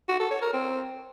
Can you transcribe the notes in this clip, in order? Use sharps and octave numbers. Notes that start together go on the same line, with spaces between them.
F#4
A4
C#5
A#4
C4